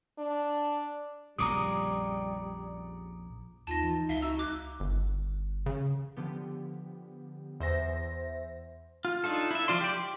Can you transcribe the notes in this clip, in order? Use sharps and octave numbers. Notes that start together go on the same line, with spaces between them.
D4
A#1 F2 C#3 G3 A#5 D6 D#6
D#2 D#4 F4 A5 A#6
E3
C#2 E5 F5 G7
F#4 A#5 E6
D6 F#6
G1
C#3
D3 F3 B3 G4
E2 C5 E5 A#6
F4
D4 D#4 F4 A4
E4 E5
F3 F4 D5 C6
G4 D5
G4